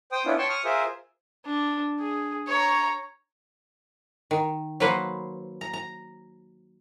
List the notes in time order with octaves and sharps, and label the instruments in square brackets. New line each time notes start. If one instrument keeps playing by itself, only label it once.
[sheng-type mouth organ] C5 G5 D#6
B3 C#4 D4 E4 F4
C#5 G5 A5 C6 C#6
C#6 D#6 F6
F4 G#4 A#4 C5 E5
[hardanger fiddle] D4
G#4
C#5 A#5
[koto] D#3
F#3 A#3 B4 C5
A#5
A#5